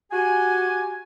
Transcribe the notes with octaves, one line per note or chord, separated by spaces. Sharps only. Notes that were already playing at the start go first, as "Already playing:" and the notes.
F#4 G4 G#5